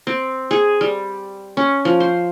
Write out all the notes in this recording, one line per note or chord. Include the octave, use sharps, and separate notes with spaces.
C4
G#4
G3
C#4
F3
C5